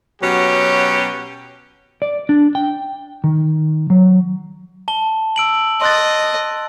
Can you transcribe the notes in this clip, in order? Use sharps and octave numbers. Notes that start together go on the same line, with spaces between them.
B2 F#3 C#4 F#4 G4
D5
D4
G5
D#3
F#3
A5 G7
E6 D7 F#7
D#5 C6 F#6 A6